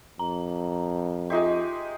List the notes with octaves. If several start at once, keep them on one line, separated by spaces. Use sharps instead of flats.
F2 A#5
G#3 D#4 F4 G4 E5 C6